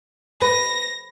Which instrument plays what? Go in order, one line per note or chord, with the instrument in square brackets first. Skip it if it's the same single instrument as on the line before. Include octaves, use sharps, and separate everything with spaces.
[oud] B4 [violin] A#6